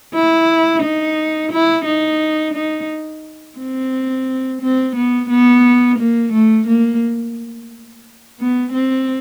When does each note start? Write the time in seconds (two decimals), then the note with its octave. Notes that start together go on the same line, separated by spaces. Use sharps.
0.14 E4
0.83 D#4
1.52 E4
1.85 D#4
2.54 D#4
3.58 C4
4.61 C4
4.96 B3
5.30 B3
5.99 A#3
6.33 A3
6.67 A#3
8.40 B3
8.73 C4